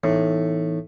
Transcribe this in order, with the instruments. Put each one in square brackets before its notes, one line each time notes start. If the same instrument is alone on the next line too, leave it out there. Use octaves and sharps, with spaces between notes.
[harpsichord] A2 [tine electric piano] E3 B3 D#4